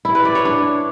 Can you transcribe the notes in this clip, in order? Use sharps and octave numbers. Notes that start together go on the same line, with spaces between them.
E4
B4
D5
C#5
D4